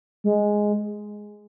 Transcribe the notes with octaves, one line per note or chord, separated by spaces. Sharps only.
G#3